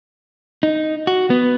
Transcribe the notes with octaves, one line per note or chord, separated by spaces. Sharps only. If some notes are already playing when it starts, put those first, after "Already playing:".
D#4
F#4
B3